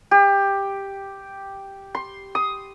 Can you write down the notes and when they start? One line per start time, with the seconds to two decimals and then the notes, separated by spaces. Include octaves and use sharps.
0.11 G4
1.95 C6
2.35 D#6